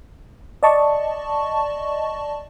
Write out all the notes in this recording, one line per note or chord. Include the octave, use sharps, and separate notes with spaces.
D5 D#5 A5 C#6